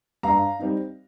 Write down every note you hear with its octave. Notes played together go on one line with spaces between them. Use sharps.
G2 F5 A#5
G3 C4 D#4